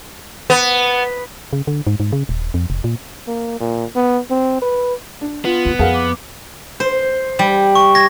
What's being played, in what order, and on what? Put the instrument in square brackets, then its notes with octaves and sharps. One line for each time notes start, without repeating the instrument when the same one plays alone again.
[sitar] B3
[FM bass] C#3
D3
G#2
G#2
C#3
D#1
F2
F1
A#2
[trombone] A#3
A#2
B3
C4
B4
[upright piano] D4
[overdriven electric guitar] B3 [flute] F4
[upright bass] D#2
[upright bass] F2 [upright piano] G#4 F5 F#5 [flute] A#4
[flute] D6
[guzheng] C5
G3
[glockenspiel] C#6
G#6 A#6